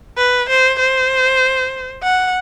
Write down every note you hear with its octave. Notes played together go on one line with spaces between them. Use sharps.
B4
C5
C5
F#5